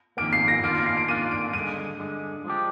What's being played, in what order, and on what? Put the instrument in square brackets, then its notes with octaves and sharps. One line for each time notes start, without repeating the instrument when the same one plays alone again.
[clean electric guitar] F2 D#3 G3 A#3 [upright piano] D7
[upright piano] C7
A#6
[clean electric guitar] D#3 A#3 D4 F4 [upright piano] D7
[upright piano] D7
C7
D7
[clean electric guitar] D#3 A#3 D4 F4 [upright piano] D#7
[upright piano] D7
[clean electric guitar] G2 D3 G#3 [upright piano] D#7
[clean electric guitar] G2 D3 G#3
F3 G#3 D4 G4